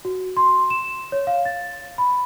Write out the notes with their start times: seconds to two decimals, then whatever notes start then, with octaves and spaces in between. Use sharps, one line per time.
0.05 F#4
0.37 C6
0.70 E7
1.12 C#5
1.27 F5
1.45 A6
1.98 B5